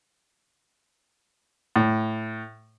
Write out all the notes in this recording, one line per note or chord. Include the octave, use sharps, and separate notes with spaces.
A2